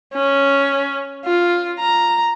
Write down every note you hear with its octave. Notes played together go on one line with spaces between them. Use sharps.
C#4
F4
A#5